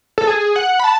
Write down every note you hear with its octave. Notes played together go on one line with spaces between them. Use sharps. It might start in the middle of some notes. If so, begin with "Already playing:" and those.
A4
G#4
F#5
B5
A5